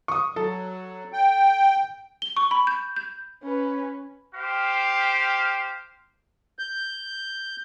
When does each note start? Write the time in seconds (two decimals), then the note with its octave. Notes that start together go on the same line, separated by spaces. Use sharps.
0.08 C#6 D#6
0.36 F#3 A4
1.13 G5
2.22 G7
2.36 C#6
2.51 B5
2.67 G6
2.96 G6
3.43 C#4 B4
4.35 G4 C5 F5
6.59 G6